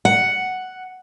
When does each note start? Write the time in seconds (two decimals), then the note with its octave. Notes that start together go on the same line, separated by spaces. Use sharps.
0.05 F#5